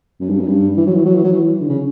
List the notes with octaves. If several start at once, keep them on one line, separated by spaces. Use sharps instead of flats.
F#2
G2
F#2
G2
E3
F#3
E3
F#3
E3
F#3
E3
D3
C#3